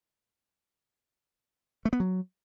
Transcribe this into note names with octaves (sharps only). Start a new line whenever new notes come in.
A3
B3
F#3